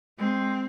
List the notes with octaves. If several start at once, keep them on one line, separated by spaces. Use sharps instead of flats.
G#3 C4